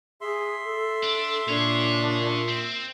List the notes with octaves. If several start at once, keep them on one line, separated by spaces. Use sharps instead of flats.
G#4 E5 C6
A4
D4
A#2 D4 G#4 C#5
C4